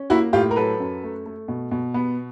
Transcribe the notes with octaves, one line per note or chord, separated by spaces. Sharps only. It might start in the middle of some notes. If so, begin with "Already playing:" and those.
Already playing: C#4
A#3 E4 F#4
A2 F4 G4
A#4
F#3 A4 B4
F#2
A3
A3
B2
B2
B3